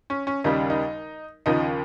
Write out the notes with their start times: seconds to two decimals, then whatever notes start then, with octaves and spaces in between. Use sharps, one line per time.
0.10 C#4
0.27 C#4
0.44 D#2 C#3 G3 D#4
0.70 D#4
1.46 D#2 C#3 F3 D#4